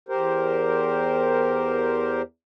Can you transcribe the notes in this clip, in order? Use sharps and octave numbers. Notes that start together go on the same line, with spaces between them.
E2 G4 A#4 C5